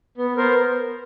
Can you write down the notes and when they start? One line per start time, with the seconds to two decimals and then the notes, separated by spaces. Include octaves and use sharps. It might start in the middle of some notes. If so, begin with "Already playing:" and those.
0.18 B3
0.37 B3 A#4 C5